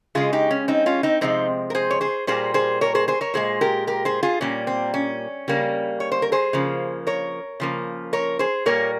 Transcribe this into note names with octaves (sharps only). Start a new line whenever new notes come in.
C#3 G#3 F4 G#4
D#4 G4
C#4
C4 D#4
C#4 F4
C4 D#4
C3 F3 G#3 C4 D#4
A#4
G#4 C5
C#5
G#4 C5
A#2 G3 A#3 G#4 C5
G#4 C5
A#4 C#5
G#4 C5
G#4 C5
A#4 C#5
A#2 G#3 G#4 C5
G4 A#4
G4 A#4
G#4 C5
F4 G#4
A#2 G3 A#3 C#4
C4
C#4
C#3 G3 A#3
C#5
C5
A#4
G#4 C5
C#3 F3 A#3
A#4 C#5
C#3 F3 A#3
A#4 C#5
G#4 C5
A#2 G3 A#3 A#4 C#5